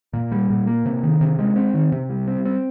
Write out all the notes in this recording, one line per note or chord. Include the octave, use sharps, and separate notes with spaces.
A#2
G3
A#2
A#3
C3
D#3
C3
G#3
C4
D#3
C3
G3
C4
C4